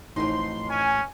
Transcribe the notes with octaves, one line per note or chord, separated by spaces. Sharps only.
A1 F2 A2 D#4 C6
C#4 G#5